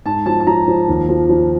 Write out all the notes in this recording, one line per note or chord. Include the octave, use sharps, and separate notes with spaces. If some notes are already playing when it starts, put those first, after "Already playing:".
G#2 A5
F3 A5
A5
F3 A#5
F3
D#2
F3
F3